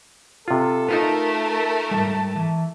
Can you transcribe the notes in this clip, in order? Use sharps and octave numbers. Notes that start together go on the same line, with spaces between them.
C3 F4 A4
A3 D#4 F4 A#4 B4
A5
G#2 C3 G3
E3